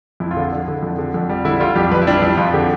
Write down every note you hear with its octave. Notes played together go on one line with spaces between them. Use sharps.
F2 E4
F4
D3 E4
D3
D3
F2
D3
F2
G3
D3 E4
G3 F4
F2 G4
F2 B4
E4
G3 D4
F2 E4
F2 F4
D3 G4